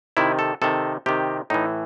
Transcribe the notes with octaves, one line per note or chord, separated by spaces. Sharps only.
C3 D#3 E4
A4
C3 D#3 A4
C3 D#3 G4
A2 E3 D#4